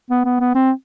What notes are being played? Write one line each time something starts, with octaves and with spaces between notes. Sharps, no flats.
B3
B3
B3
C4